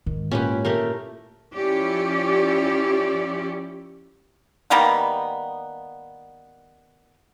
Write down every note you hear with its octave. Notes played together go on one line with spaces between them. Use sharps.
G#2 D#3
A#2 A#3 C#4 E4 F4 G4 B4
A3 G4 A#4
F3 C#4 E4 F4 G4 D5
D#3 G3 A#3 B3